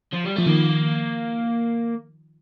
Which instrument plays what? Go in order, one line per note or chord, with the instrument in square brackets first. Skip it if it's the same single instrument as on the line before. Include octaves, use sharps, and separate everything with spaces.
[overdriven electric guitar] F3
G3
[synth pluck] F3 [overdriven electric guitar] A3
[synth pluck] D#3 [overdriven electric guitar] A#3